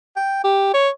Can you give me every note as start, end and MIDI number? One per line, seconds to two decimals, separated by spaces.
0.16 0.41 79
0.44 0.69 67
0.74 0.89 73